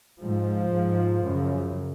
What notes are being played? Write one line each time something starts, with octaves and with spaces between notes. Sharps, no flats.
G#2 F3
G#2
F#2 C#3